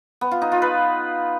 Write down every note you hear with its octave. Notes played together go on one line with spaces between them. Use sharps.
B3
F4
D#4
F4
B4